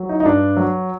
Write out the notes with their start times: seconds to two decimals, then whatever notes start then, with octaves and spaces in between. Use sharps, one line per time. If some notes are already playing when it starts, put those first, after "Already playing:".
Already playing: F#3
0.09 D#4
0.20 D#4
0.25 G2 D4
0.57 F#3